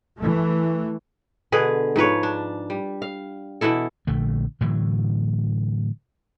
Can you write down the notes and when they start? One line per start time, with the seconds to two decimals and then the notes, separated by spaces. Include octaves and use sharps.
0.19 E3 A3
1.52 B2 D3 G#4 B4
1.96 G#2 F3 B4 C#5
2.23 D4
2.70 G3
3.02 F5
3.61 B2 E3 E4 A4
4.07 A#1 D3 A3
4.61 A2 D3 E3 F#3